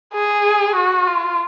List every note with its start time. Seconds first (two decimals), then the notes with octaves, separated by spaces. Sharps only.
0.14 G#4
0.76 F#4
1.07 F4